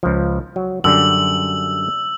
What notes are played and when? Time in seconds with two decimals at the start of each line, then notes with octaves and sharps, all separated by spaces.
0.03 C#2 F3
0.56 F#3
0.84 F#2 D3 G3 E6 F#7